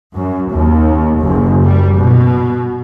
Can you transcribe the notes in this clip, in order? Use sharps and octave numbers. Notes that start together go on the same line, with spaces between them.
F#2
D#2
F#1
G3
B2